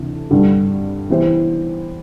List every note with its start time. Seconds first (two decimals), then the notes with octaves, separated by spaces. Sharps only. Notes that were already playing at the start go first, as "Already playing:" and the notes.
Already playing: D2 C3 E3 A3
0.31 G2 D3 G3
1.10 E3 B3 E4 G4 C5